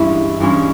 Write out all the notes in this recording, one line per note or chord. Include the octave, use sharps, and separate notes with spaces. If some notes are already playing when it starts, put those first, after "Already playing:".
Already playing: G2 E3 G#3 C#4 E4
G2 E3 G#3 C#4